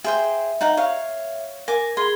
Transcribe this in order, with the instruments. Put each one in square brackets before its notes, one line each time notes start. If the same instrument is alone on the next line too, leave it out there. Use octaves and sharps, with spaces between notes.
[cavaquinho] G#4 C5 G5 [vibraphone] E5
[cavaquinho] D#4 F#5 A#5
C#5 F5
[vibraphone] A#4 [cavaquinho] G#5 D6
[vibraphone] G#4 B5 [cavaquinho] C6